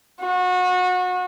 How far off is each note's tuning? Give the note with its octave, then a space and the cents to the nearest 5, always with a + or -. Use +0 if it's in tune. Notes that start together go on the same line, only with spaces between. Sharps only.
F#4 -30